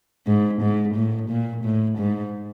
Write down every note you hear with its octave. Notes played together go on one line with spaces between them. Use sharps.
G#2
G#2
A2
A#2
A2
G#2